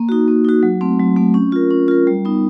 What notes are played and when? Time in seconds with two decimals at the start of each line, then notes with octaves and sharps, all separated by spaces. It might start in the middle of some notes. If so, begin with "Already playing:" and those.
Already playing: A#3
0.09 D#4 F#4
0.28 A#3
0.45 D#4 F#4
0.63 F#3
0.81 A3 C4
0.99 F#3
1.17 A3 C4
1.34 C#4
1.52 F4 A#4
1.71 C#4
1.88 F4 A#4
2.07 G3
2.25 B3 D#4